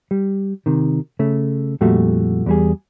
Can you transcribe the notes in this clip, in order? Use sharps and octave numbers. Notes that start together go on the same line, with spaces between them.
G3
C3 D#3
C#3 A3
F2 A#2 G3 A3 F#4
E2 G3 G#4